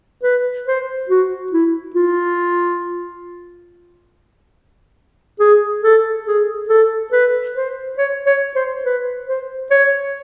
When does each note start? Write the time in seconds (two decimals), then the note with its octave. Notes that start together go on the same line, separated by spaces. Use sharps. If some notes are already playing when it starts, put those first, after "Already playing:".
0.23 B4
0.66 C5
1.09 F#4
1.52 E4
1.95 F4
5.40 G#4
5.83 A4
6.26 G#4
6.69 A4
7.12 B4
7.56 C5
7.98 C#5
8.26 C#5
8.55 C5
8.84 B4
9.28 C5
9.71 C#5